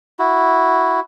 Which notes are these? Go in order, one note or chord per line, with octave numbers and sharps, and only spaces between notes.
E4 F#4